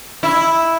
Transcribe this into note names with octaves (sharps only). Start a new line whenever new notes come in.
E4